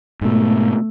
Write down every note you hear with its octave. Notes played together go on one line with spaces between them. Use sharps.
G#2 B2 A3